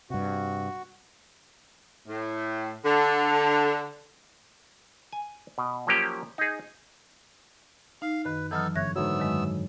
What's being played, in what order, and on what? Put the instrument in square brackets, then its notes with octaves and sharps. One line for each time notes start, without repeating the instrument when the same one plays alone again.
[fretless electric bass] G2 C3 [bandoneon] F#4
[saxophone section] A2
D3
[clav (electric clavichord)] G#5
B2
F3 F#3 A#3 C#4 G4
D#4 G#4
[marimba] D#4 [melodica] F5
[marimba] F#2 D#3 [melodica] B4
[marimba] E3 F#3 F6 [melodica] B3 D#4 A4
[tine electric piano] G1 [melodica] C#5 [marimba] E5 F#6 A#6
[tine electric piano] G#2 D3 F#3 [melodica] A3 B3 E6
[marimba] F#2 D#3 G#3